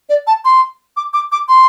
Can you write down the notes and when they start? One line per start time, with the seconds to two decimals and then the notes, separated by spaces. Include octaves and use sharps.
0.09 D5
0.27 A5
0.45 C6
0.97 D6
1.13 D6
1.32 D6
1.49 C6